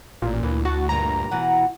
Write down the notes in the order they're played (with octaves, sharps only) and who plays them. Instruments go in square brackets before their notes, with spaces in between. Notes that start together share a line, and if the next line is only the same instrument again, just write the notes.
[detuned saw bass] A1 [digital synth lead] A#2
[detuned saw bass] D2 [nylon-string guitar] E3
[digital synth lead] F#4 [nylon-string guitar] A5
[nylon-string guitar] G2 A#2 G3 [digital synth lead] A#5
[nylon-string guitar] B2 E3 F#5